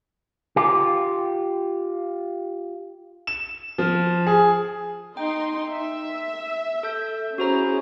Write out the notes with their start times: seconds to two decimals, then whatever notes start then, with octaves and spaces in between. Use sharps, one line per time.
0.56 F4 G4
3.27 E7
3.78 F3
4.27 G#4
5.17 D#4 G5 C6
5.71 E5
6.83 A4 G6
7.38 C#4 E4 F#4 G#4 C5 A#5